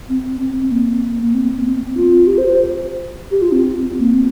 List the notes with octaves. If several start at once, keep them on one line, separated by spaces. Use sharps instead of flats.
C4
C4
C4
A#3
A#3
C4
A#3
C4
F4
G4
C5
C5
G4
F4
C4
A#3
C4